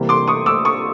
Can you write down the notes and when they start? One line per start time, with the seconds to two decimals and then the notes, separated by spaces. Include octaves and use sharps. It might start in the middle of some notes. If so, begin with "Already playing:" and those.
Already playing: C3 E3 G3 A#3
0.09 C6 D6
0.28 C#6 D#6
0.46 D6 E6
0.65 C#6 D#6